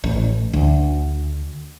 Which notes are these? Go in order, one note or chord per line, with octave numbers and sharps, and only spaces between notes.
A1
D2